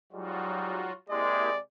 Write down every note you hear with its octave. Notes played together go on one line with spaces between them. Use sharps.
G#2 F#3 G3 D#4 F4 F#4
C3 G#3 A#3 E4 G4 D5